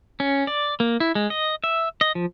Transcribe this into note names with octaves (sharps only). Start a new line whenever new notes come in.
C#4
D5
A#3
E4
G#3
D#5
E5
D#5
F3